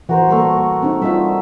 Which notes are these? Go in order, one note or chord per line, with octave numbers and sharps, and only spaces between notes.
E3 F#4 A#4 C5
G3 A3 A#3 A#4 C#6
C4 D#4
G3 D#4 F4 E5